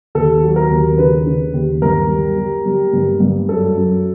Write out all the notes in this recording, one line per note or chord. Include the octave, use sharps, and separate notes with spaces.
D#2 A4
F#3
A#4
D#2
C#3 B4
C#3
D#2
G2 A#4
G3
G3
G3
G2
G2
F#2 A4
F#2